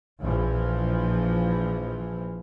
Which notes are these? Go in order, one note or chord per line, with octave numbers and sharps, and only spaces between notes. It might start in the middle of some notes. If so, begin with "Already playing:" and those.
A#1 E3 F3